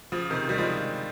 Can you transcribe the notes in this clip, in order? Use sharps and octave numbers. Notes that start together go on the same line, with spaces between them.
C#3 F3
C3 D#3
D#3 G3
F3 G#3